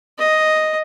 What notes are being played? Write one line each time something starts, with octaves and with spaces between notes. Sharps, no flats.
D#5